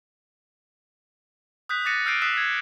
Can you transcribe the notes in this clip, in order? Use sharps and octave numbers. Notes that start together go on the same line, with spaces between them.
D#6 F#6 G6 B6
D6 F#6 A6 A#6 C#7 D#7
E6 F6 G6 C7 D7 D#7
D#6 E6 F#6 B6 C7 E7
G#6 B6